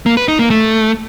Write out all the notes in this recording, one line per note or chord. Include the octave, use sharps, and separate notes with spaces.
A#3
B4
D#4
A#3
A3